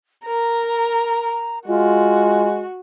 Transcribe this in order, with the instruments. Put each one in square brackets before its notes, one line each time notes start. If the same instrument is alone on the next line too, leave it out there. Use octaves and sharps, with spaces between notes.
[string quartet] A#4 [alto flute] A#5
[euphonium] G#3 [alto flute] F4 [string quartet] F#4